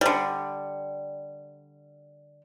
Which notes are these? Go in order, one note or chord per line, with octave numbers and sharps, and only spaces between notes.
D3 G3